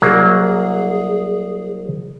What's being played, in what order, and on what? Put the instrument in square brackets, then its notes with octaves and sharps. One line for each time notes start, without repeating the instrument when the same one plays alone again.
[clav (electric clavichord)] C2 F#3 A#3 [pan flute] G#4